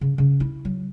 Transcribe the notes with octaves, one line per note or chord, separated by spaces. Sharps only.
C#3
C#3
E4
F#3